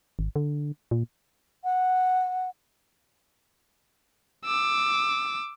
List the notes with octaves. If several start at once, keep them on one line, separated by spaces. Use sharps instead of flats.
G#1
D3
A#2
F#5
D6 E6